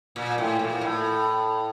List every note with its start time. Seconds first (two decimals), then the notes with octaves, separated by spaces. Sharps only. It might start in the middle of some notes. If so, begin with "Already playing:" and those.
0.16 A#2
0.38 A2
0.59 A#2
0.81 A2